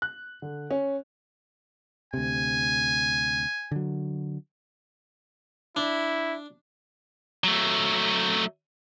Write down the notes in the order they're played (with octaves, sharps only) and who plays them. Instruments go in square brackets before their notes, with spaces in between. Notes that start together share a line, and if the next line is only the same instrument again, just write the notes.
[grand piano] F#6
D3
C#4
[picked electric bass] D2 C3 [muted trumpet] G#5
[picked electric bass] D3 F#3
[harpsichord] D4 [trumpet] E4
[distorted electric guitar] F#3 A3